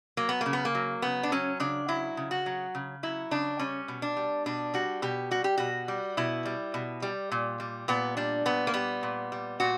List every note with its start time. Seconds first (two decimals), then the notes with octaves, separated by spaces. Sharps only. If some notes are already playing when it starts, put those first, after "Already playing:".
0.17 F#3 A#3
0.29 B3
0.41 C#3 A#3
0.53 B3
0.65 A#3
0.75 F#3
1.02 C#3 B3
1.23 D4
1.32 F#3 C#4
1.60 C#3 D4
1.88 F#3 E4
2.17 C#3
2.31 F#4
2.46 F#3
2.75 C#3
3.03 F#3 E4
3.31 C#3 D4
3.59 G3 C#4
3.88 B2
4.02 D4
4.17 G3
4.46 B2 D4
4.74 G3 F#4
5.02 B2 G4
5.31 G3 F#4
5.44 G4
5.58 B2 F#4
5.88 G3
6.17 B2 E4
6.45 G3
6.74 B2
7.02 G3
7.32 A#2
7.60 G3
7.88 A#2 B3
8.17 G3 D4
8.46 A#2 B3
8.67 A#3
8.74 G3 B3
9.03 A#2
9.32 G3
9.60 A#2 F#4